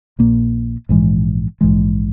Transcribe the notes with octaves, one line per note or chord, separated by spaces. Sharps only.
A#1 A#2 A#3
A#1 G#2 E3 G#3
A#1 G#2 E3 G#3